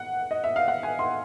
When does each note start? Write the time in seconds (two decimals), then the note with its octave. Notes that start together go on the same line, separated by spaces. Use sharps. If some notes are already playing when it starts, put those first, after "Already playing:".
Already playing: F#5
0.31 D#5
0.44 E5
0.56 F5
0.68 F#5
0.83 G#5
0.99 C6